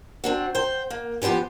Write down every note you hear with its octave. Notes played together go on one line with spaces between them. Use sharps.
C4 D4 F#4
C5 G5
A#3
E3 F3 B3 G4 C5